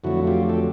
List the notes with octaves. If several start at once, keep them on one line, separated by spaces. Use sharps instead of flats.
F2 D3 F#3 A3 E4 F#4
F4 G4
G4 A4